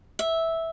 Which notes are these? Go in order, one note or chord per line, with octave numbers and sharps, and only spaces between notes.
E5